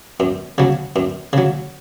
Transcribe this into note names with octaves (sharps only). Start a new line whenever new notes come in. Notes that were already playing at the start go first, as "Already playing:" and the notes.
F#2
C#3 F#3
F#2
C#3 F#3